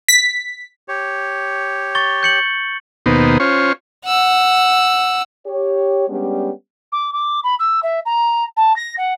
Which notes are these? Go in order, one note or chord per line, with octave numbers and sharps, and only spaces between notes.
B6
G4 C#5
C#6 A6 G7
G6 C#7 F#7
D#2 B2 A#3 B3 D#4 C5
C#4 F4 C5 C#5
F#5 E6
G4 C#5
G3 G#3 B3 C#4 D4 G4
D6
D6
B5
E6
E5
A#5
A5
A#6
F#5